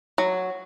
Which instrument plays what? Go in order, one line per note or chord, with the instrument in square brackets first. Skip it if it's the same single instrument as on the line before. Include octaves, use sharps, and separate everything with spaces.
[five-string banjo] F#3